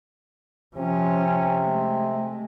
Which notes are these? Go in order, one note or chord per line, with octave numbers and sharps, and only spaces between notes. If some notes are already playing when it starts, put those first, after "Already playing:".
C3 F3 C#4
G#3 A3